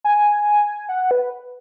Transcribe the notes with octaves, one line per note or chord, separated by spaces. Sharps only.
G#5
F#5
B4